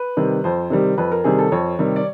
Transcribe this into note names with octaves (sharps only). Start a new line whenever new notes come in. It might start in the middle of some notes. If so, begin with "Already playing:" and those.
Already playing: B4
C3 D#3 G3
F2 C5
C3 D#3 G3
F2 B4
A#4
C3 D#3 G3 G#4
A4
F2 C#5
C3 D#3 G3
D5